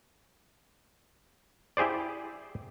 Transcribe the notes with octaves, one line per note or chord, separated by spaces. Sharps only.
E4 G4 G#4 C5 D5